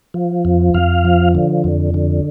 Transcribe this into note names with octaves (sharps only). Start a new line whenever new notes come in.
F3
F2
F2 F5
F3
D3
F2
D3